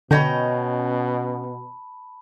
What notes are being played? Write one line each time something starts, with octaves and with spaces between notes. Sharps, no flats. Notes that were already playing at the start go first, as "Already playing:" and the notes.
B2 D3 C#4 D#5 G5 A5 B5